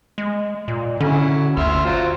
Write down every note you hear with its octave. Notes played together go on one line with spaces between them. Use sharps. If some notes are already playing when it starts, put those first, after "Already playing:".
G#3
A#2
D3 F#3 C#4 E4
G1 D2 E5 C6 F6
F#3 C4 F4